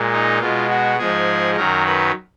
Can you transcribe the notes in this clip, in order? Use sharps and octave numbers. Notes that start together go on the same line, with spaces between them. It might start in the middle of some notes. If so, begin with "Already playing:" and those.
Already playing: A#2 G#3
D#4
B2 G#3 F4
F#4
G#2 F3 G#3 G#4
F#2 D#3 F#3 A#4
B4